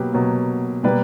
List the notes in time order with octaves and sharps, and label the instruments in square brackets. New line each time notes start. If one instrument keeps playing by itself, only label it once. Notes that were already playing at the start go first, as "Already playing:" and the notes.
Already playing: [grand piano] B2 F#3 A#3 G4 B4
B2 F#3 A#3
B2 G3 A#3 B4 D5